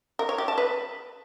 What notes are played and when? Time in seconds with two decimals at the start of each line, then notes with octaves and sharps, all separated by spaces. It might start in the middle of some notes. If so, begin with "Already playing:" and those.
0.19 A#4
0.29 C#5
0.38 G4
0.48 A5
0.58 B4